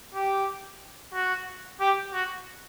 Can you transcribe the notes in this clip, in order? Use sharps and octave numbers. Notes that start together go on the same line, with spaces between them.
G4
F#4
G4
F#4